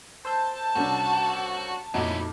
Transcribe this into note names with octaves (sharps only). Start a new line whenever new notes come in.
C5 A5 E6 G6
C2 C#3 D4 F#4
F2 A#2 F#3 D#4 E4 F#4